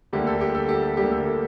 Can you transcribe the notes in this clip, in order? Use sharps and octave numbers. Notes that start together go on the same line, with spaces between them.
D2 D3 G3 A#3 G4
A4
G4
A4
G4
A4
D2 D3 G3 A#3 G4
A4
G4